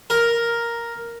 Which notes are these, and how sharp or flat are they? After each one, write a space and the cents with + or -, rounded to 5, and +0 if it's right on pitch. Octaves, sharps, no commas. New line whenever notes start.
A#4 +0